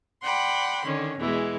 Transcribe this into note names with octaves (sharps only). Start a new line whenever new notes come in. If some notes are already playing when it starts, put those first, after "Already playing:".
D5 F#5 G5 B5 C6
D3 D#3 C#4
E2 B2 E3 G#3